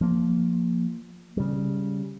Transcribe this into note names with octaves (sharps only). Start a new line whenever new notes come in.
F3 A#3
C#3 G3